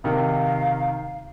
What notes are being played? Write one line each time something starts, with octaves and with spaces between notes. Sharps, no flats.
C3 D#3 F5